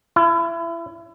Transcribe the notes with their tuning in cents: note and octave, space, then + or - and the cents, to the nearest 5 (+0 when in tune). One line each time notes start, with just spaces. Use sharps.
E4 +30